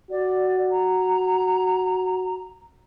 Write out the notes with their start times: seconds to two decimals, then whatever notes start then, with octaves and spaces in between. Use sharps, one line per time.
0.11 F#4 D5
0.71 A#5